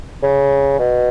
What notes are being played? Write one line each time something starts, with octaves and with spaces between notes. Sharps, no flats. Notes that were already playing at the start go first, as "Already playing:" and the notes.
C#3
B2